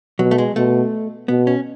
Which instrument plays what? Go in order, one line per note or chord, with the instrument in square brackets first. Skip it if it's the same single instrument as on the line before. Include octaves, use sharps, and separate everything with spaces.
[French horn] B2 [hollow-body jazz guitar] F#3
[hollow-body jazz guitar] A3
G#3
[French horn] B2 [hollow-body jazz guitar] A3
[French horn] B2 [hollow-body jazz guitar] B3
[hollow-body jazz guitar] C#4